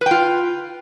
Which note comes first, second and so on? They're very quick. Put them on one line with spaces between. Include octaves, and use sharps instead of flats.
B4 G5 F4